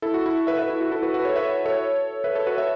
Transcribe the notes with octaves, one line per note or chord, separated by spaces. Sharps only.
E4 A4
F#4
E4
B4 E5
B4 E5
E4
F#4
E4 A4
F#4 B4
F#4 B4
A4 C#5
B4 E5
A4 C#5
B4 E5
A4 C#5
F#4 B4
B4 E5